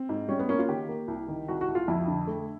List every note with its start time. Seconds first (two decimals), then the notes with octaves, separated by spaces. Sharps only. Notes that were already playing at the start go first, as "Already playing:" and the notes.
Already playing: C4
0.09 G#2
0.29 G3 C#4
0.39 B3
0.49 A#3 C#4
0.59 F4
0.69 D#3 G4
0.88 A#3
1.08 C2
1.28 D#3
1.48 C2 F#4
1.61 F#4
1.68 C2
1.75 F4
1.88 F2 E4
2.07 D3
2.27 A3